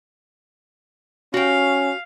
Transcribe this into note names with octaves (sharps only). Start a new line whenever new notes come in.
C#4 F#4 F5 G5